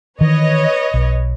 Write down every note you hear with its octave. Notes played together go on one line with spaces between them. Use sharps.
D#3 E3 B4 C#5 D#5
B1